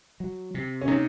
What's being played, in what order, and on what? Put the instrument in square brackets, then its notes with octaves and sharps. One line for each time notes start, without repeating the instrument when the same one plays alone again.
[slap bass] F#3
C3
[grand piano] C#4
[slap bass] C3 [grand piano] D#4